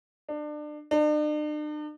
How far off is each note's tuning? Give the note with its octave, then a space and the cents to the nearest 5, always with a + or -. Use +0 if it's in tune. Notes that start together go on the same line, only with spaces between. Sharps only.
D4 +30
D4 +45